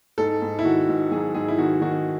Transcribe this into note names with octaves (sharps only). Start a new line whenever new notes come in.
G#2 A4
G#2
E4
D#3 F#4
G#2
F#3 G#4
G#2 G#4
E4
D#3 F#4
D#3 F#4